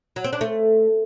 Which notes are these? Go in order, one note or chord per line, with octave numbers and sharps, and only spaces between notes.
F#3
C4
D4
A3